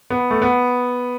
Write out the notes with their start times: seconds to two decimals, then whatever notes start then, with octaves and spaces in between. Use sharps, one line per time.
0.10 B3
0.30 A3
0.42 B3